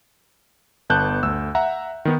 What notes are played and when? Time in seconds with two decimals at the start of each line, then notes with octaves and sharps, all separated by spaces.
0.90 G1 B3 A5 F#6 G6
1.23 D2 E6
1.55 E5 F#5 A#5
2.05 D#3 B3 D#4